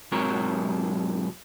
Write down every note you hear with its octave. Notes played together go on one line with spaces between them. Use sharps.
B1 G#2 F#3 C4 A#4 C#5